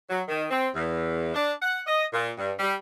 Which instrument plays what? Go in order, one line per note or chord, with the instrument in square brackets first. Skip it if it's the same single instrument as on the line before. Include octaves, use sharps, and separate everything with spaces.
[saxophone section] F#3
D#3
C4
E2
D4
F#5
D#5
A#2
G2
G3